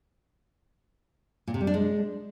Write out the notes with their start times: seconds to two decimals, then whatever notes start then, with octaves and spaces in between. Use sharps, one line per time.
1.47 A#2
1.54 C3
1.61 G3
1.67 D4
1.74 G#3